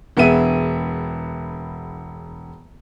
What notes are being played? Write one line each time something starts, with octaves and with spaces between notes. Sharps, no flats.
E1 B3 G#4 E5 D#7